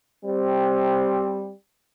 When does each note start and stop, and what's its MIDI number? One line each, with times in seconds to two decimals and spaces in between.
0.24 1.50 55
0.24 1.50 60